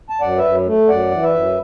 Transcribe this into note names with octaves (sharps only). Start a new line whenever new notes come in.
A5
F#2 D5 F#5
B4 E5
F#2
A3
F#2 D5 F#5
E3
B4 E5
F#2